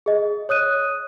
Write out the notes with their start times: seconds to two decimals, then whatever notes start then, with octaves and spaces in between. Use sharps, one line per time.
0.06 G#4 D#5
0.49 C#5 D#6 F#6 D#7